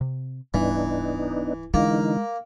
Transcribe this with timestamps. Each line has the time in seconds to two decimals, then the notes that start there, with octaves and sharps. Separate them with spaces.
0.01 C3
0.54 D1 G#2 E3 G3 B3 D4 D#4
1.74 D3 E3 G#3 A#3 D#4